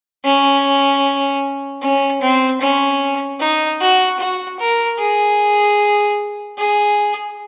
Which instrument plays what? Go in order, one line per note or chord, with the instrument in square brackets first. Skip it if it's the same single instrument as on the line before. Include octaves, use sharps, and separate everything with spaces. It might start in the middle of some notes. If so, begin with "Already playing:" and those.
[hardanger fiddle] C#4
C#4
C4
C#4
D#4
F#4
F#4
A#4
G#4
G#4